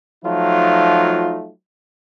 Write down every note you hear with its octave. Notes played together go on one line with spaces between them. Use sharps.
F3 F#3 A3 D#4 F4